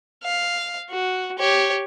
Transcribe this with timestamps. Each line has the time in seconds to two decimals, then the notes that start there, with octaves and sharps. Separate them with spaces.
0.24 F5
0.90 F#4
1.39 G4 C#5